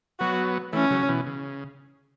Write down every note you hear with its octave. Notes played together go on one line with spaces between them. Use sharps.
F#3 B3 F#4
E3 A3 C#4
C#3 F#3
B2 E3
C#3